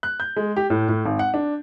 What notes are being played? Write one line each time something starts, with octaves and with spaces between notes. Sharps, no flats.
F#6
G6
G#3
G4
A2
A2
G#1
F#5
D4